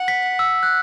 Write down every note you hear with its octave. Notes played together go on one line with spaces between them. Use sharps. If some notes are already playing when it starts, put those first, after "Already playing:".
Already playing: F#5
B6
E6
F#6